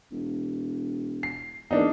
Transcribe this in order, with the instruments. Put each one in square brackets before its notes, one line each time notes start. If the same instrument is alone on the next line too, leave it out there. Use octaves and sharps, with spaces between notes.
[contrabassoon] E1
[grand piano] C7
[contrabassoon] E2 [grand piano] A#3 D4 D#4